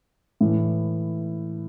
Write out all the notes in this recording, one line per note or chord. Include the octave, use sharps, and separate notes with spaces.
A2 E3